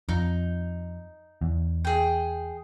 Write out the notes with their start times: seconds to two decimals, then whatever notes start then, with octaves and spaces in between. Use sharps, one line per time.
0.09 F2 D#4
1.41 E2
1.85 G#4 G5